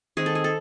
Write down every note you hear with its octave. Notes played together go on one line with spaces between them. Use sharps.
D#3 G#3 C4 G#4
A4
G#4
A4